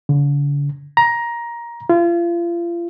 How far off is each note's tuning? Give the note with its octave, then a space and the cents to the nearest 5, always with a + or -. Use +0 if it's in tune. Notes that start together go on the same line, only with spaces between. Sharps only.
D3 -45
A#5 +15
F4 -35